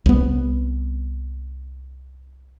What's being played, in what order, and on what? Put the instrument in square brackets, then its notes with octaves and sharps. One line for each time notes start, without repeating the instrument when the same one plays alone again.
[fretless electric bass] C2 B3